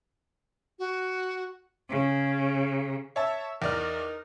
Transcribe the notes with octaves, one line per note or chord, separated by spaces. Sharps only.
F#4
C#3
C#5 E5 A5
E2 D#4 A#4 D5 F6